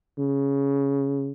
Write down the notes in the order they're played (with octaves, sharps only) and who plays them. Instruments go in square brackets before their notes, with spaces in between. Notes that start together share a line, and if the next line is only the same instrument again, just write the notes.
[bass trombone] C#3